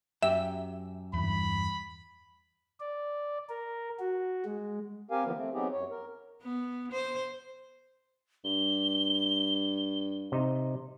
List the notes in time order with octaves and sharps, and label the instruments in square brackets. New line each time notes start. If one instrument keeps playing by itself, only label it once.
[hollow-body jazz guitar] F#2 G4 [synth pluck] E5
[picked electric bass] E2 G2 [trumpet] B5
[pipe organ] D5
A#4
F#4
G#3
[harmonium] C4 G4 A#4 F5 G#5
D3 E3 F3 A#3 B3
A3 C4
F#3 B3 C4 D#4 G4 G#4
F#2 C#5
A#4
[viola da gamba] B3
C5
[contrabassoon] G2 [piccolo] G7
[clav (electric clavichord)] C3 D#4